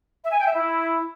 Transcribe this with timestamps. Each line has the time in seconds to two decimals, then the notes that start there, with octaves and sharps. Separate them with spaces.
0.23 E5
0.31 G#5
0.38 G5
0.46 E5
0.53 E4